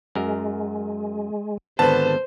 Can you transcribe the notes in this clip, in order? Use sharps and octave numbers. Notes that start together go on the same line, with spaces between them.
F#2 G#3 A#4
G#1 D3 B3 B4 C5 A5